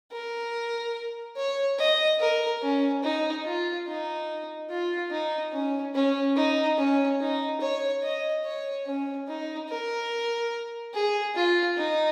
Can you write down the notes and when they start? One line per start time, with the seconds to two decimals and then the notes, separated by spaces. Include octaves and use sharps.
0.12 A#4
1.36 C#5
1.79 D#5
2.20 A#4
2.62 C#4
3.03 D#4
3.45 F4
3.87 D#4
4.70 F4
5.11 D#4
5.52 C#4
5.95 C#4
6.36 D#4
6.78 C#4
7.20 D#4
7.61 C#5
8.03 D#5
8.44 C#5
8.86 C#4
9.28 D#4
9.69 A#4
10.94 G#4
11.35 F4
11.77 D#4